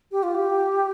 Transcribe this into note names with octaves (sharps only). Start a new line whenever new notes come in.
G4
F4
G4